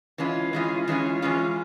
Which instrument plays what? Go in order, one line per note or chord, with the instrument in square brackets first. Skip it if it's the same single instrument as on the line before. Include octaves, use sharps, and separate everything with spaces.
[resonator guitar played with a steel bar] E3 G#3 C#4 F4
E3 G#3 C#4 F4
E3 G#3 C#4 F4
E3 G#3 C#4 F4